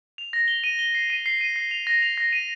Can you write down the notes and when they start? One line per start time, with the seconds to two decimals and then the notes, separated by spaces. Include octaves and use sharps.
0.18 F7
0.33 A#6
0.48 G7
0.64 D#7
0.79 G7
0.95 C7
1.10 D#7
1.26 C7
1.41 D#7
1.56 C7
1.71 F7
1.87 A#6
2.02 F7
2.18 A#6
2.33 D#7